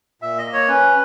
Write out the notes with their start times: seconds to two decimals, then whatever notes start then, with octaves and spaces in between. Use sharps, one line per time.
0.22 A#2 E5
0.38 D#5
0.45 A#3
0.53 C#5
0.68 C#4 B4